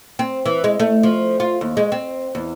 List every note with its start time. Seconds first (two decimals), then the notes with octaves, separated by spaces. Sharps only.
0.19 C4
0.46 E3
0.64 G#3
0.80 A3
1.03 F3
1.40 F4
1.61 D#2
1.77 G#3
1.92 C4
2.35 E2